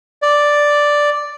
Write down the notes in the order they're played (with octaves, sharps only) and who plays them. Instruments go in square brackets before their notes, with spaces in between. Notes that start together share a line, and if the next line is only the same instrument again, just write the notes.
[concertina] D5